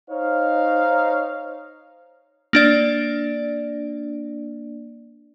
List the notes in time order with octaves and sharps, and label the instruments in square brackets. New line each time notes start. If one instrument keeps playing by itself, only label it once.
[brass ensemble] D#4 C5 C#5 F5
[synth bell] A#3 D4 D5